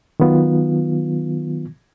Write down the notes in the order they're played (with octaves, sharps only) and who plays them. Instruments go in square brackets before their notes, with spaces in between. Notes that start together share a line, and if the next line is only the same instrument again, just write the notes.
[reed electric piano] D#3 F#3 B3 F4